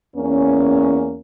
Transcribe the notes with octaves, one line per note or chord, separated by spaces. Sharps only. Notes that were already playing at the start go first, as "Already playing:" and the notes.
E2 A#3 C#4